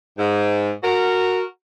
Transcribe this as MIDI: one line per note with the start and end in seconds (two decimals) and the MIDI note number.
0.18 0.71 44
0.84 1.43 66
0.84 1.43 70